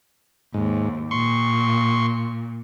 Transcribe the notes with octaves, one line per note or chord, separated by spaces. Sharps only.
D#2 G#2
A#2 C6 C#6